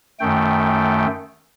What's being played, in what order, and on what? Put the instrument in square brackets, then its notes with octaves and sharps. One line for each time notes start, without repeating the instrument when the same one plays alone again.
[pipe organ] F#2 D#3 A3 G5